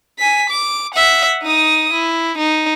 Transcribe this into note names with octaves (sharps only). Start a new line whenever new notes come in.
G#5 B6
D6
E5 F#5
D#4 D#6
E4
D#4